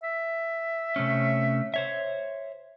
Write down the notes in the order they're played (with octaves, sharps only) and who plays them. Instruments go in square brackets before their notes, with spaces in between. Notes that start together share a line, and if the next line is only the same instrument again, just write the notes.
[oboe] E5
[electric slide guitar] C3 A3 C#4
C5 C#5 E5